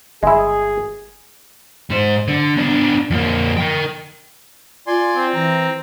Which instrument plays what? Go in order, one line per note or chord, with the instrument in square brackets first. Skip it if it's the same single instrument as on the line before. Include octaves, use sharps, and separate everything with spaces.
[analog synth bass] G1 [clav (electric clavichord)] G#3 E4 [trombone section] G#4
[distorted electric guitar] G#2 C5
D3
B3 D4
F2 A#3
A#4 G5
[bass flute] F4 [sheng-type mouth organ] D5 G#5 C6
[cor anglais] C4
[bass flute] E3 [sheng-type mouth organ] A#5